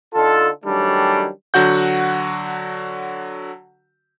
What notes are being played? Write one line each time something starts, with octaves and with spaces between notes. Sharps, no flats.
D3 D#4 F4 A4
D#3 F#3 G3 A3 C#4 D4
D3 F#3 F#4 F#5 G6